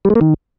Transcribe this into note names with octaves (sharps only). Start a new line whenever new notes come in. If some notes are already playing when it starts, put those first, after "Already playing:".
G3
G#3
A#3
D#3